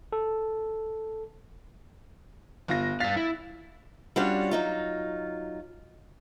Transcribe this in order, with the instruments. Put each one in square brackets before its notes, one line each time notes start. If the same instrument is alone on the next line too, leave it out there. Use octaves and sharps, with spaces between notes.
[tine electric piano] A4
[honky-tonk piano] G1 F4 A#6
[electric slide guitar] G2 F5 [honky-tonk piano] A6 B6
[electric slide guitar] E4
[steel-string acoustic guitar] G3 C#4 D4 F4 F#4 C#5
F#3 D#4 F4